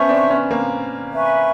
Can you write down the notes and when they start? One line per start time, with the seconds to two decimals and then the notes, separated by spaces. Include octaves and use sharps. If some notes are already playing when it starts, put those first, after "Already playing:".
Already playing: B3 C#4 C5 E5 A5 C#6
0.09 C4 D4
0.30 B3 C#4
0.51 A#3 C4
1.13 B4 E5 G#5 C#6